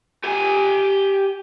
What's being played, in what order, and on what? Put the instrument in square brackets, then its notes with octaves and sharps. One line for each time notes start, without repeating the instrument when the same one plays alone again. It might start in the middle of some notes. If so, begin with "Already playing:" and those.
[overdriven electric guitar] G4 G#5